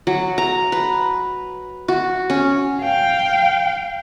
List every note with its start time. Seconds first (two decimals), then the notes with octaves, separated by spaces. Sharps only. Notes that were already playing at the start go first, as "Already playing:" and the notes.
0.07 F#3
0.38 A#5
0.72 B4
1.88 F#4
2.30 C#4
2.81 F5 G5